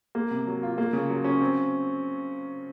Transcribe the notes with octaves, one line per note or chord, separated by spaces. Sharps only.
A#3
C3
F#3
F4
A#3
C#3
F#3
C#4
C4